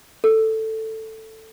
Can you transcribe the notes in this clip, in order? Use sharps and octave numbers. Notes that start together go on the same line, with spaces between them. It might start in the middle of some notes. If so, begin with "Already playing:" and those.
A4